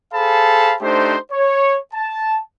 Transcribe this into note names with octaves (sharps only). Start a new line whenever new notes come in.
G#4 A4 C5 F5 A5 B5
A3 D4 D#4 G4 C5
C#5
A5